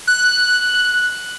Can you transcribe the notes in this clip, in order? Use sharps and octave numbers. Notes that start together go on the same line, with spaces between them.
F#6